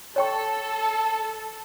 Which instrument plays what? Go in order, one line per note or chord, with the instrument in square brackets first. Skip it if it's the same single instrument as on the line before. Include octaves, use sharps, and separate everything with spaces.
[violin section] A4 [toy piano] C#5 G5 C#6